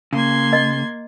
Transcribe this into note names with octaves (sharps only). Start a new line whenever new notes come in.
C#3 A#3 C6 G#6
D#5